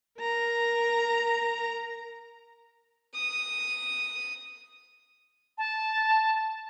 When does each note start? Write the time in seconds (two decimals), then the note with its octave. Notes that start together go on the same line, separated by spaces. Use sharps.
0.20 A#4 A#5
3.15 D#6
5.58 A5